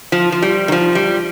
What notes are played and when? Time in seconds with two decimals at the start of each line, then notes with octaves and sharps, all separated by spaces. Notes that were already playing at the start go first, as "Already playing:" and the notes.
0.12 F3
0.32 F3
0.42 G3
0.68 D#3
0.72 F3
0.95 G3